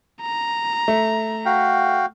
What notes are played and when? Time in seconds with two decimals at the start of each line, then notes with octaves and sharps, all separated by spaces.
0.21 A#5
0.88 A3
1.46 F#4 F5 G5